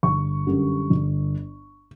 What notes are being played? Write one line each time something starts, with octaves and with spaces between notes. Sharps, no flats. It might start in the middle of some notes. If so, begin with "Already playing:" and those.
G1 C#6
F#2 D3 G3
G1